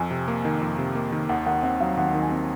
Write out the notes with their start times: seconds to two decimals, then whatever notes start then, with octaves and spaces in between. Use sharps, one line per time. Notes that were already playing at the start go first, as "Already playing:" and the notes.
Already playing: F2 G#5
0.11 C3
0.28 A#3
0.45 D#3
0.62 F2
0.78 C3
0.95 A#3
1.12 D#3
1.29 D#2 F#5
1.46 D#3 F#5
1.63 C4 F#5
1.80 F#3 F5
1.97 D#2 F#5
2.14 D#3
2.20 G#5
2.31 C4